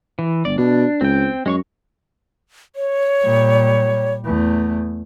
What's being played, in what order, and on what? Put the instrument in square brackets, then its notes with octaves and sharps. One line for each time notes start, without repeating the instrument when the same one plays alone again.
[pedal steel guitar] E3
[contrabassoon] G1 [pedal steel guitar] D5
[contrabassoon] B2 [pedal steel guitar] D4
[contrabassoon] C#2 [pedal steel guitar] C4 G5
[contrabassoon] F#2 [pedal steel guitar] G#3 C#5 C#6
[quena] C#5
[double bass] A#2 G3
E2 A3